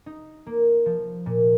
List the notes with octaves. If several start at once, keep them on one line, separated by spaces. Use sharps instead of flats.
D#4
A#3
F3
A#2